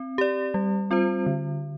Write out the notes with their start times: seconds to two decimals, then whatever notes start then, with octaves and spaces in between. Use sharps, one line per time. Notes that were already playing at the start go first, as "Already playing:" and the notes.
Already playing: C4
0.18 G4 D5
0.54 G3
0.91 C4 F4 C5
1.26 D3